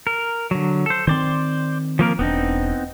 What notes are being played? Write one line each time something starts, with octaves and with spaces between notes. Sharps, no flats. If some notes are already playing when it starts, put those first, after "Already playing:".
A#4
D3 F#3
A4 C5
D#3 C4 C5 D5 C6
F3 A#3 A#4
E1 B3 C4 D4 D#4